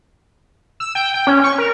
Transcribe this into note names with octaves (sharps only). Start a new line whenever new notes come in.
E6
G5
G5
C#4
C#6
A#4